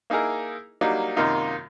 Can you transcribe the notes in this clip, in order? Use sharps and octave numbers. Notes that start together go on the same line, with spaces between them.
A#3 D#4 E4 G#4 A#4
F#3 G3 A#3 D4 D#4
F#2 C3 D#3 A#3 D#4 F4